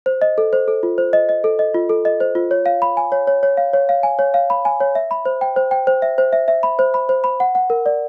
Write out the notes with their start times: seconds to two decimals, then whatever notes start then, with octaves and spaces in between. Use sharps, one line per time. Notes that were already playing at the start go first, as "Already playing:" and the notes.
0.06 C5
0.22 D#5
0.38 A4
0.53 C5
0.68 A4
0.83 F4
0.98 C5
1.13 D#5
1.29 D#5
1.44 A4
1.59 D#5
1.74 F4
1.89 A4
2.05 D#5
2.20 C5
2.35 F4
2.51 C#5
2.66 F5
2.82 B5
2.97 G#5
3.12 C#5
3.27 C#5
3.43 C#5
3.57 F5
3.73 C#5
3.89 F5
4.03 G#5
4.19 C#5
4.34 F5
4.50 B5
4.65 G#5
4.80 C#5
4.95 E5
5.11 B5
5.26 C5
5.41 G5
5.56 C5
5.71 G5
5.87 C5
6.02 E5
6.18 C5
6.33 E5
6.48 E5
6.63 B5
6.79 C5
6.94 B5
7.09 C5
7.24 B5
7.40 F#5
7.55 F#5
7.70 A#4
7.86 D5